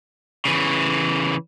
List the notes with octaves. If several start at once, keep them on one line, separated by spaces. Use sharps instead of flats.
C#3 E3